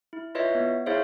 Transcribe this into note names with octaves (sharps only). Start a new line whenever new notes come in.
E4
E4 F4 B4 C#5 D#5 E5
B3
E4 G#4 C5 C#5 E5 F5